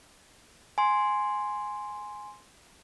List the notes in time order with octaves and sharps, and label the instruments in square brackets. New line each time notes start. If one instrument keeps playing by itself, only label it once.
[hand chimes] G#5 C6